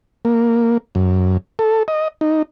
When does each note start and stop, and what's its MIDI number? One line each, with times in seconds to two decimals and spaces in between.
0.25 0.78 58
0.95 1.37 42
1.59 1.83 69
1.88 2.08 75
2.21 2.42 63